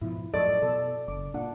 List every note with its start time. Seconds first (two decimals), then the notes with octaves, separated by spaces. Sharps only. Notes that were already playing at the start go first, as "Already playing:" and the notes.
0.02 G#2 B2 F3 E4
0.34 F#2 A2 F3 A4 D5 D#5 C#6
0.62 B2 A4
1.08 F#1 D6
1.34 A#2 D4 F#5